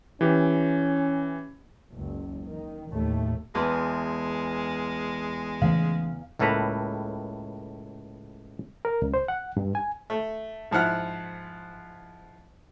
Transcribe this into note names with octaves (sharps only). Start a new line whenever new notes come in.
E3 C#4 G4
F#1 C#2
D#3
D#2 A2 A3
E2 G#3 A5 C6
C#3 E3 A3 F5
C#2 A2 A#3 A4 B4 A#5
A#4
C#2
C5
F#5
G2
G#5
A3
G#2 F3 E4 F#5 F6